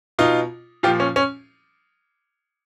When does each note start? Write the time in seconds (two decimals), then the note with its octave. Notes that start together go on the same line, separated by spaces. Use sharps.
0.19 B2 D#4 F4
0.83 A#2 F3 F4 G4
1.00 C#4
1.16 C#4